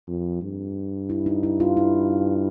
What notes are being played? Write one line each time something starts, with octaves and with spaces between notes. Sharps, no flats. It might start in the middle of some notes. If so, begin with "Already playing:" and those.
F2
G2
E4
D#4
E4
F4
E4